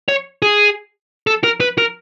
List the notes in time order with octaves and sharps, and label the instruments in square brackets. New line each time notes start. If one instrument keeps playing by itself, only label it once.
[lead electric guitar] C#5
G#4
A4
A#4
B4
A#4